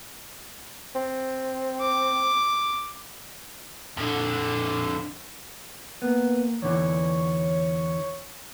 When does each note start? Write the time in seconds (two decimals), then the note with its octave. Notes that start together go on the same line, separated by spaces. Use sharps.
0.95 C4
1.80 D6
3.97 F2 D3
6.02 A#3 B3
6.62 E2 D3 E3 C#5